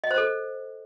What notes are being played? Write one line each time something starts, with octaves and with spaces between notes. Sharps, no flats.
D#5
C5
A4